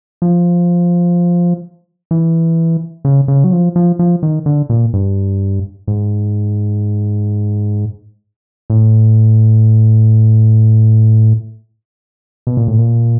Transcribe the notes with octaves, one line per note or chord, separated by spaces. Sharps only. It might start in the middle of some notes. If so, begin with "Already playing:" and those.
F3
E3
C#3
C#3
F#3
F3
F3
F3
D#3
D3
A#2
G2
G#2
A2
B2
A#2
A2
A#2